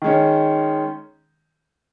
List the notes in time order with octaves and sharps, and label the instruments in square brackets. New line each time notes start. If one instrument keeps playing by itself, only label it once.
[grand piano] D#3 G#3 C#4